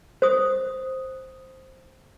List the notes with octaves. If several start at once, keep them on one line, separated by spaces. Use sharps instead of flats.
C5 D#6